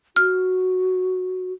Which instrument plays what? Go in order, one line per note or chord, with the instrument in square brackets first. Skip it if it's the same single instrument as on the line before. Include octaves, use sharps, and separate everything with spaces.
[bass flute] F#4 [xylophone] F6